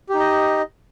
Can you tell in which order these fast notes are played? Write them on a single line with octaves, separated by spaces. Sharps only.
G4 D#4 D#5